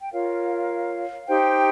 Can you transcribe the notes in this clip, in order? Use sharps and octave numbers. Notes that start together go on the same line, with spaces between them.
G5
F4 A#4 C#5 F5
D#4 G4 C5 G5